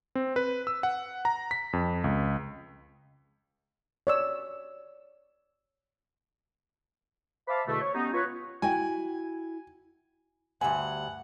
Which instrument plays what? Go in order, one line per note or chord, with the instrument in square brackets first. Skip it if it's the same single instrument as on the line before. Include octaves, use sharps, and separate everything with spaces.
[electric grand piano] C4
B4
E6
F#5
A#5
B6
F2
C#2
[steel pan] C#5 D5 E6
[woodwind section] C5 E5 F5 A5 B5 D6
E2 B2 D3 A3
C#5
G3 B3 C#4 D#4
F4 B4 C#5
[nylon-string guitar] E4 F#4 G5 [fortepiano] G#5
[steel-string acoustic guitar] D2 G2 [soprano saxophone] F#5 [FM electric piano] G#5